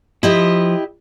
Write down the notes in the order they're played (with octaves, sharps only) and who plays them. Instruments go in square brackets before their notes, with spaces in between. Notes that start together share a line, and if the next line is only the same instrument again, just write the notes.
[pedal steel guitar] F3 [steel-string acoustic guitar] E4 G4 D#5